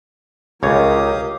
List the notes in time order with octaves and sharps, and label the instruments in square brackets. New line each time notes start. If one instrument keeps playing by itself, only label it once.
[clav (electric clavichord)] C#2 C#5 [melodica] G4 F5 D#6 [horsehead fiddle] A#4